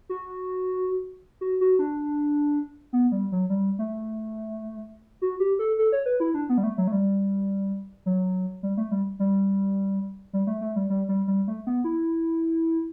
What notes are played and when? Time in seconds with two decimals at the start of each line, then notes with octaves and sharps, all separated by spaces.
0.09 F#4
1.41 F#4
1.61 F#4
1.79 D4
2.93 B3
3.12 G3
3.32 F#3
3.50 G3
3.79 A3
5.22 F#4
5.40 G4
5.59 A4
5.79 A4
5.92 C#5
6.06 B4
6.20 E4
6.34 D4
6.49 B3
6.58 G3
6.63 A3
6.78 F#3
6.87 A3
6.92 G3
8.06 F#3
8.63 G3
8.77 A3
8.91 G3
9.19 G3
10.33 G3
10.47 A3
10.61 A3
10.76 G3
10.90 G3
11.09 G3
11.28 G3
11.48 A3
11.67 B3
11.84 E4